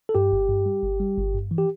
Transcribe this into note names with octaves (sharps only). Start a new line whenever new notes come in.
A4
G2 G4
G1
G2
G3
G1
G3
G1
G2
E3
G4